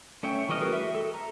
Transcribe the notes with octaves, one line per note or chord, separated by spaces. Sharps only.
A3 C#4 C#5 E5 G5
E3 G3 A3 D#5 F6
F#4 G#4 A#4 B4
E5
A4
A#5